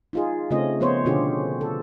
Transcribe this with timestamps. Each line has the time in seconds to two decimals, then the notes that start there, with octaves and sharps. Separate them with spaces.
0.13 D#4 F4 G#4
0.51 C#3 A3 C4 C#4 F4 D#5
0.80 F3 B3 C5 C#5
1.05 B2 D3 C#4 F4 G4 G#4
1.61 A4